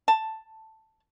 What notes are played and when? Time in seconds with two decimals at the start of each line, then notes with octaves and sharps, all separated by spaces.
0.08 A5